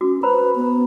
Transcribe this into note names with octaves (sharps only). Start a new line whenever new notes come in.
C#4 F#4 D6
B4 C5 A#5 B5
B3